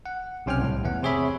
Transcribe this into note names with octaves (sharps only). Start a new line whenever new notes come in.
F#5
B1 C3 C#4 G5 G#5 F6
C2 A2
E2 B3 F#5
C3 C4 G#4 C#5 E5 B5